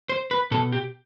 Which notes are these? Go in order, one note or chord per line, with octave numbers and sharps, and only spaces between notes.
C5
B4
B2 A4
G4